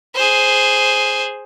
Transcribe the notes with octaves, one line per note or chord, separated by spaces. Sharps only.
G#4 C5